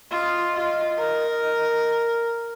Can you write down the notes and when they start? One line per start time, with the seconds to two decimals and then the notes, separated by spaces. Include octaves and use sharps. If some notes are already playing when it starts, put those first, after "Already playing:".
0.11 F4 D#5
0.55 F4
0.98 A#4